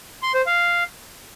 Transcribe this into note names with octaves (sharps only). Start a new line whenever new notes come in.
C6
C5
F5